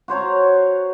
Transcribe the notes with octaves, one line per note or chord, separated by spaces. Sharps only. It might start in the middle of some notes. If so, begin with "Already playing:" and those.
F#4 C5 C#5 A#5